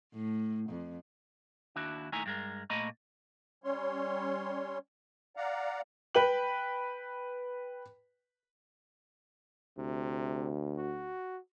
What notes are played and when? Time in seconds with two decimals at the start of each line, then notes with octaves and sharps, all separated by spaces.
0.14 A2
0.70 F2
1.76 D#2 D4 E4 F#4
2.12 D#2 A3 D#4 E4 G#5 A#5
2.26 G2 G#3 A#4
2.70 A#2 A3 A#3 D#5 A#5 B5
3.64 G3 C#4 C#5 C6
5.37 D5 F5 F#5 A#5
6.15 B4 G5 F#7
9.78 D2 C3
10.77 F#4